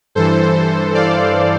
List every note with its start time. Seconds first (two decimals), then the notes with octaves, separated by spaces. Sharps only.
0.15 G2 E3 A4 C5
0.94 D5 F5